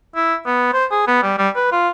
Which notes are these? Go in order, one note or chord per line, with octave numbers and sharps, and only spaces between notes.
E4
B3
C5
G#4
B3
G3
G3
B4
F4